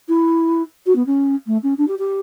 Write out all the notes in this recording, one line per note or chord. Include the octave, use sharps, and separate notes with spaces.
E4
F#4
B3
C#4
A3
C#4
D4
G4
G4